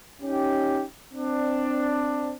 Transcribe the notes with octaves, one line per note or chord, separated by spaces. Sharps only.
C#4 D#4 G4
C4 D4